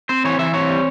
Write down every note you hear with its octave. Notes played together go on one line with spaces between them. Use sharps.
C4 C5
E3 C#5
E3 E5
C4 C#5
G3